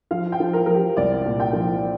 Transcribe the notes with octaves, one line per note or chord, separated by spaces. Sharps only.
F3 F5
G5
F3
A#4
F3 A#4
G4
C2 D5
A#2
G5
F3